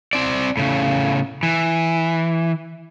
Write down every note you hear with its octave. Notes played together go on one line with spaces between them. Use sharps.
C4 D5
A2 C#3
E3